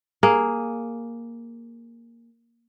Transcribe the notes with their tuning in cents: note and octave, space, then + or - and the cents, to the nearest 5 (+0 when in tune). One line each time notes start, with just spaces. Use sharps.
A#3 +0 G#4 +0